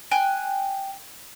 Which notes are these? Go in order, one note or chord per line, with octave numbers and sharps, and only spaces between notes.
G5 G#5 F#6